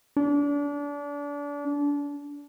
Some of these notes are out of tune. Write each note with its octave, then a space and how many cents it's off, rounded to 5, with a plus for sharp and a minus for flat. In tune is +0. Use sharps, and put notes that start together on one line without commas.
D4 -30